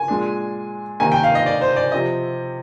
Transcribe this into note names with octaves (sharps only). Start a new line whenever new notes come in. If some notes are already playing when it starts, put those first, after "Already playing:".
Already playing: G#5
A#2 G#3 D4
C3 D#3 A#3 D#4 G#5
G5
F5
D#5
D5
C5
D5
C3 F3 C4 D#5